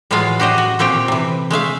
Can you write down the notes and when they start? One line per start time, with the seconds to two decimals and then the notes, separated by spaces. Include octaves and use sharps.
0.11 A2 E3 F#3 G#3 F4 F5
0.40 F#4 G4 C5 D#5
0.58 F#4
0.79 A#2 A3 C4 G4 G5
1.08 C3 E3
1.51 G#3 A3 E5 F5